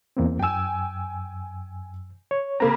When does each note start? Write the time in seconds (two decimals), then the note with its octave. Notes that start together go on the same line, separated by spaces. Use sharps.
0.17 E2 A#3 C4
0.39 F#2 G5 G#5 E6
2.31 C#5
2.60 C#3 A#3 C4 A#5 B5